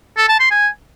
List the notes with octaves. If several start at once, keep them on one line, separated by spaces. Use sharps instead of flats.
A4
A5
C6
G#5